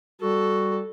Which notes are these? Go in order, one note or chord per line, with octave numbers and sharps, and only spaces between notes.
G3 F#4 A4